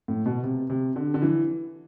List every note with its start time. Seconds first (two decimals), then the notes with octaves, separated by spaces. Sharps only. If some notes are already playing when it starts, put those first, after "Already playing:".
0.08 A2
0.26 B2
0.43 C3
0.70 C3
0.96 D3
1.14 D3
1.22 E3